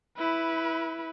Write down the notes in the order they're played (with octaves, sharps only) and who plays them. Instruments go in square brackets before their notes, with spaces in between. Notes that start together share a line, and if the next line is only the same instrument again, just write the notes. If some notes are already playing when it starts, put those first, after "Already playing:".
[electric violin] E4 B4